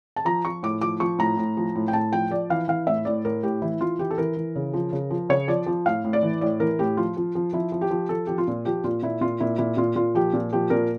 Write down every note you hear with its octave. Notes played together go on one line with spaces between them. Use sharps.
A5
F3 A#5
F3 C#6
A2 D6
F3 D6
F3 C#6
A2 A#5
A2
F3
A2
G5
A2 A5
F3 G5
F3 D5
E3 F5
E3 F5
A2 E5
A2 D5
A2 A#4
A2 G4
E3 E4
E3 F4
E3 G4
A4
E3 A#4
E3
C#3
F3
C#3
F3
C#3 C#5
F3 D5
F3
A2 F5
A2
D5
E3
A2 D5
E3 A#4
A2 G4
F3 F4
F3
F3
F3 E4
F3
G4
F3
F3 A4
F3 G4
F4
A#2
F3 G4
A#2 F4
A#2 E4
A#2 F4
A#2 E4
A#2 E4
A#2 F4
A#2 F4
F3 G4
A#2
F3 G4
A#2 A#4